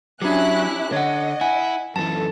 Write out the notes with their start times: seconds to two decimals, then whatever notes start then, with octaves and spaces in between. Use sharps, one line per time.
0.22 F#3 C#4 D4 E4 G4 F#6
0.92 D3 C#5 D#5 F#5
1.41 E4 F#5 G#5
1.96 F#2 E3 A4 A5